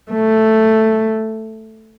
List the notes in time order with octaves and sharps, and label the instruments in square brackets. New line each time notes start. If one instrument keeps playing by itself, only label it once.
[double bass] A3